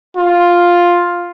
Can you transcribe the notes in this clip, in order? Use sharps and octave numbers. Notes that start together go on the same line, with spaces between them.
F4